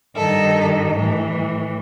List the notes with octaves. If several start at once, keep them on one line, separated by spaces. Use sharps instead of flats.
G2 D#3 A4
A2 E3